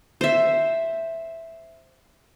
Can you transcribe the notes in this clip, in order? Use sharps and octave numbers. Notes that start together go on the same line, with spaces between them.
C5 E5